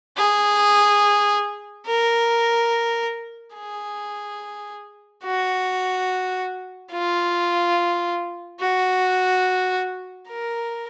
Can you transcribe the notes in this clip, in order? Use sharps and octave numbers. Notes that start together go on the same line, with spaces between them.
G#4
A#4
G#4
F#4
F4
F#4
A#4